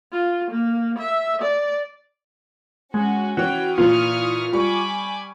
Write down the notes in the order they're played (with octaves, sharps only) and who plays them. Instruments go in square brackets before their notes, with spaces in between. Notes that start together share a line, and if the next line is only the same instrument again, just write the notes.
[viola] F4
A#3
E5
D5
[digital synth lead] G#3 [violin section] C#4 F#4
[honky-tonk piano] E3 C#4 [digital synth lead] F#4 [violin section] G5
[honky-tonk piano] A#2 E3 [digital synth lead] F4 [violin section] C#6 D#6 F6
[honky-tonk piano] G3 C#6 [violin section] G#5 B5 D6